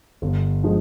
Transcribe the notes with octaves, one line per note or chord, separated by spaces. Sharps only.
G1
D3 F3 G#3